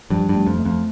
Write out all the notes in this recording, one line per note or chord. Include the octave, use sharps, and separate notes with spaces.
G2 F3
G2
A3
F2
A3
F2